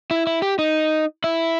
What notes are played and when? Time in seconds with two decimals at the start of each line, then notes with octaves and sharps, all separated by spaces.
0.11 E4
0.27 E4
0.42 G4
0.59 D#4
1.24 E4